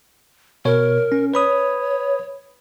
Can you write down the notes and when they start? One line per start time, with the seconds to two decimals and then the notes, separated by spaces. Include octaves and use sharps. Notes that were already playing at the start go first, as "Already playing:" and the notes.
0.65 B2 A#4 C#5
1.12 C#4
1.34 B4 C#5 B5 D#6